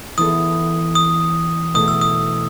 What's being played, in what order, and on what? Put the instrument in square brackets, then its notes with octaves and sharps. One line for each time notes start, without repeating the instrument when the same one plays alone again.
[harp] E3 B3 E4 A4 [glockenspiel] D#6
[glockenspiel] D#6
[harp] B2 A3 E4 A4 [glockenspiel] D#6
[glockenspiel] E6
D#6